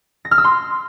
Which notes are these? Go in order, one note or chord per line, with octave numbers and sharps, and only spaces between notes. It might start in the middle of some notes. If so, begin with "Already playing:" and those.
A#6
F6
E6
C6